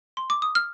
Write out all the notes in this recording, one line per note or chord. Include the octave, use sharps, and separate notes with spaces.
C6
D6
D#6
F6